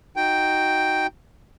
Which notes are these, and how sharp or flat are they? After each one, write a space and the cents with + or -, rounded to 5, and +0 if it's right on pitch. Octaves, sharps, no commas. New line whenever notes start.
D#4 +0 F#4 +0 G5 +0